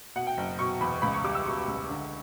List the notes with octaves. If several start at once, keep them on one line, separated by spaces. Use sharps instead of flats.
B2 F#5
G5
F#1
B2 C#6
E2 B5
C#2 B5
C#6
G3 D6
E6
B2 C#6
C#2
D3